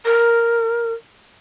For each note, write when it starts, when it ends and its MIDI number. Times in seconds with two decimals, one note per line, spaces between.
0.05 0.93 70